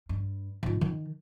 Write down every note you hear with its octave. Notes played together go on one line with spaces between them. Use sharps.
G2
G#2 F4
D#3